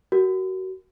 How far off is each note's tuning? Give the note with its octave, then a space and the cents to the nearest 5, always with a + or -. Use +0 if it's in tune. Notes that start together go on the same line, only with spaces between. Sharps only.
F#4 +25 A#4 +0